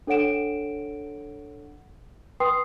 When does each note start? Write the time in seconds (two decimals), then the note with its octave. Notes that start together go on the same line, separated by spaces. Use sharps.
0.07 D4 A4 C#5 F#5 D7 E7
2.40 B4 G5 C6 D#6 C7